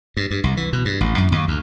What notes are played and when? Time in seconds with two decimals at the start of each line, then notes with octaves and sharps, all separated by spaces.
0.17 G2
0.31 G2
0.44 C2
0.57 E3
0.73 B2
0.85 G2
1.01 A1
1.18 F#2
1.32 D#2
1.48 D2